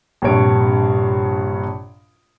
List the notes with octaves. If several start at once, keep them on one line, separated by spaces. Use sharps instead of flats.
A#1 G2 C3 C#5 D7